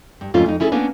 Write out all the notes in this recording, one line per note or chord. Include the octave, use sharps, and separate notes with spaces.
G2
F2 G#2 A3 C#4 F4
F2 D#4
C#4 E4 G#4 A4
A#3 B3 C#4 D4